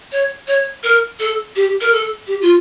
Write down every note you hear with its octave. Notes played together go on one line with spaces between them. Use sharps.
C#5
C#5
A#4
A4
G4
A#4
A4
G4
F4